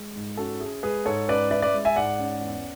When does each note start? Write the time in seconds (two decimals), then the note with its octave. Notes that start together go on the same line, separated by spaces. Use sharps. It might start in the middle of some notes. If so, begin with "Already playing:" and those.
Already playing: G#3
0.16 G#2
0.37 C#4 F#4 A4
0.60 E4 G#4
0.83 G#3 G#4 B4
1.05 G#2 A4 C#5
1.29 C#4 B4 D5
1.51 E4 B4 D5
1.62 B4 D5
1.74 G#3
1.85 E5 G#5
1.96 G#2 D5 F#5
2.19 C#4
2.41 E2